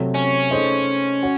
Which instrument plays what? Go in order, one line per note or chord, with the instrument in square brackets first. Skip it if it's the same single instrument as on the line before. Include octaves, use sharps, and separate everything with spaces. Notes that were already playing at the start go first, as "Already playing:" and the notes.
Already playing: [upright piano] C3 F#3 A3
[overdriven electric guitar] C#4
[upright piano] A3 D#4 G#4 C5 D#5
F#4 C#5